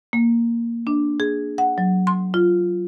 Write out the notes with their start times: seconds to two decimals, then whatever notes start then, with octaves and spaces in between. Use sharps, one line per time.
0.13 A#3
0.87 D4
1.20 G#4
1.58 F#5
1.78 F#3
2.07 C6
2.34 F4